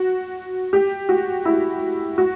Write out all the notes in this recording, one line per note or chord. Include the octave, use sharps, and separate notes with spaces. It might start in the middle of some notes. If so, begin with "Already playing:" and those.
Already playing: F#4
G4
F#4
E4
F#4